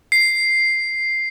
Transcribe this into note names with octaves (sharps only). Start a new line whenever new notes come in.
C7